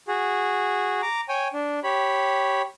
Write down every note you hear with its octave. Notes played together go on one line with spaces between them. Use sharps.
F#4 G#4
A#5 D6
C#5 G5 G#5
D4
G4 C#5 B5